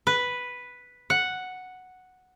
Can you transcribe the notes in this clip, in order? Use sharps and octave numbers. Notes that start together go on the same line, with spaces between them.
B4
F#5